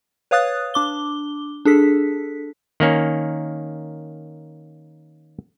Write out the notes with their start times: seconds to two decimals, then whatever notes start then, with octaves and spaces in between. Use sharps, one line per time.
0.31 B4 C#5 F5 D#6 F#6 A6
0.74 D4 D6 G7
1.65 D4 G#4 A4 B6
2.80 D#3 A#3 C#4